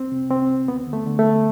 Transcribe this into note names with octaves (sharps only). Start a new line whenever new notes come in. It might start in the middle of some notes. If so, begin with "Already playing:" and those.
Already playing: C2 C4
C3
C2 C4
C2
D2 B3
D3
A3
D3
A3
D2